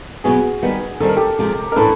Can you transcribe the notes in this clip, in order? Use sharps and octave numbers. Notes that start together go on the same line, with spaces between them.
B2 F#3 B3 F#4 G#4
D#3 G3 B3
D#3 G3 C4 A4
A#4
G4 A4
C3 F3 G#3
A#4
A2 E3 A3 D4 A4 B4